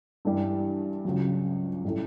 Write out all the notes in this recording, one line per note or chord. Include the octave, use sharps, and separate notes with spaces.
G2 E3 G3
C#2 C#3 F#3
A2 G3 C#4 E4 A4